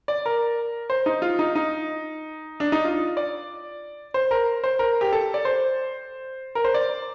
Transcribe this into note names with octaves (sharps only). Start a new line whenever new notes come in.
D5
A#4
C5
D#4
F4
D#4
D#4
D4
D#4
F4
D5
C5
A#4
C5
A#4
G4
A4
D5
C5
A#4
C5
D5